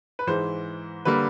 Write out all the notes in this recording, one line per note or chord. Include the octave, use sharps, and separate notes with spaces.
B4
G#2 E3 G#3 C5
D3 G3 A#3 B4